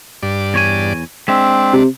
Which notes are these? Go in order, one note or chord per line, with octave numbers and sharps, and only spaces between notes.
G2 D5
E2 C#5 G#5
G#3 C4 D4 E5
C3